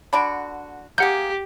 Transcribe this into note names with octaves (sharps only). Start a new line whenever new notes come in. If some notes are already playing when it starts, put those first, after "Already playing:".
D3 D4 F#4 B5 D7
A#3 G4 G#4 F#5 G6